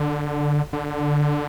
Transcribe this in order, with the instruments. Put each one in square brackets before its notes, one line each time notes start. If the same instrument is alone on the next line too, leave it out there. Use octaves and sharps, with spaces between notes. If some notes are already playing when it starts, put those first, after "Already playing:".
Already playing: [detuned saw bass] D3
D3